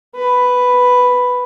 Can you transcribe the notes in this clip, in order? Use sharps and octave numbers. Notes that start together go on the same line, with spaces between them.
B4